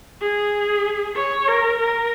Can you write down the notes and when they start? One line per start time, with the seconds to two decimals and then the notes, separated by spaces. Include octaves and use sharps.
0.22 G#4
1.16 C#5
1.48 A#4
1.80 A#4